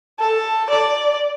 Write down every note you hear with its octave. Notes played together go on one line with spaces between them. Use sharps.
A4
D5